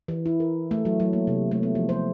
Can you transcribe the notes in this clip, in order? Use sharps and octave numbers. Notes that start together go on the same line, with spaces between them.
E3
E4
A#4
A3
F#3
F#3
A#3
C3
A3
B3
F3
C5